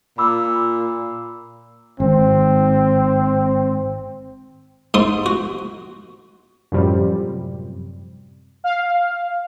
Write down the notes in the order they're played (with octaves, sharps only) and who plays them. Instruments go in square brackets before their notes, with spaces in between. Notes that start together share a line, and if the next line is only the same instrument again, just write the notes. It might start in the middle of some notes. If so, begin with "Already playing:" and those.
[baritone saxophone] A#2 [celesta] B5 D6 E6
[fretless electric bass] G#1 [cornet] C4
[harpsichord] G#2 C6 D#6
F#4
[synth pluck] F#2 A2 C3 F3 G3 C4
[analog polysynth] F5